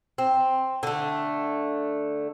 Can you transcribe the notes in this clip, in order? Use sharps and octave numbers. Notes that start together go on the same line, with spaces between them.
C4
D3 A3